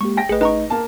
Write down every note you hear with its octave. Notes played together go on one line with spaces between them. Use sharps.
G#3 A#3 G4 C#6
G5 A#6 D7
G#1 A3 G#4 B4 D#5
D#4 B4 A#5 C#6
A#3 A5